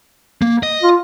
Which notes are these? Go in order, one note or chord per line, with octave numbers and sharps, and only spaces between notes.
A#3
D#5
F4